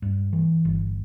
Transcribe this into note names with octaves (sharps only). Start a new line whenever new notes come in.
G2
E3
G1